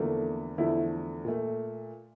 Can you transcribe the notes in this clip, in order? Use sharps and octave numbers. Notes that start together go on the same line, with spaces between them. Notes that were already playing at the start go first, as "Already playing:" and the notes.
Already playing: E2 D3 F3 A3 A#3
E2 D3 F3 A3 E4
A#2 A3